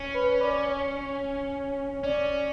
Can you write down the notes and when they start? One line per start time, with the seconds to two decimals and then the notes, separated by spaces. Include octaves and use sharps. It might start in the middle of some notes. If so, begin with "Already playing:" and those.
Already playing: C#4
0.14 B4
0.41 D5
0.69 C#5
0.95 C#5
2.03 C#4 D5